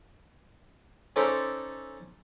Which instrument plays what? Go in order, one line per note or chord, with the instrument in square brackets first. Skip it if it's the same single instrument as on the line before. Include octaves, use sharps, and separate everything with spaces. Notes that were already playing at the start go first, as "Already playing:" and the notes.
[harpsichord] C#4 D#4 A4 C5 D5 B5